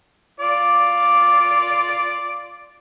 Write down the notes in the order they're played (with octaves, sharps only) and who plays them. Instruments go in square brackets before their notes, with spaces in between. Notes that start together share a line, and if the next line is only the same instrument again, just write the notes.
[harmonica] F4 D5 D6